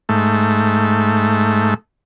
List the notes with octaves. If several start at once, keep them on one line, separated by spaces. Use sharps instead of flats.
G#2 A3